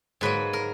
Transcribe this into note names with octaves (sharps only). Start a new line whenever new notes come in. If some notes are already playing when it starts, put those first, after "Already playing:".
G#2 F#3 A#3 B4
A#4